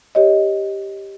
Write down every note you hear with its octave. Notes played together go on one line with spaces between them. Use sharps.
G4 C#5 D#5